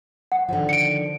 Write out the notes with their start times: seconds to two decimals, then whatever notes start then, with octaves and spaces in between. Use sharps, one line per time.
0.32 F#5
0.49 D3 D#3 F3
0.69 C#7 D7